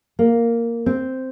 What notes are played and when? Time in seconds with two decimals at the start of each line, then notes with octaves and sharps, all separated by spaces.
0.19 A#3
0.86 C4